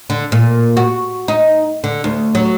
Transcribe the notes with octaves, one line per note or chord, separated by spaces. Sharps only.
D3
A#2
F#4
D#4
D3
D2
F#3